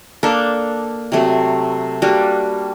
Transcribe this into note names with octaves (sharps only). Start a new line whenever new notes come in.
A#3 D4 A4
C3 F#3 A3
G3 A#3 D4 F#4